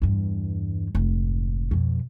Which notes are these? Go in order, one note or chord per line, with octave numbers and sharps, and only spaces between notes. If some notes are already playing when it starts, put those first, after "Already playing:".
E2 G2
F1 G#2
F2 B2